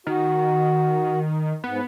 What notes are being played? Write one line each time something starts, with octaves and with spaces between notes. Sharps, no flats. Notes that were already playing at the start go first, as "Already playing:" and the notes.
D#3 F#4
G#2 B3